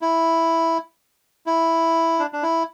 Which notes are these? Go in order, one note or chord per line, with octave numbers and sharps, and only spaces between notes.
E4
E4
D4
D4
E4